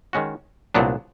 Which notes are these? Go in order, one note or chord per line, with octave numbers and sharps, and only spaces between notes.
D#3 G#3 C#4 F#4
C2 A#2 F#3 B3 D4